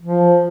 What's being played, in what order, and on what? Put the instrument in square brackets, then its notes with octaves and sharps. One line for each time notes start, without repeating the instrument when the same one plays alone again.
[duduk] F3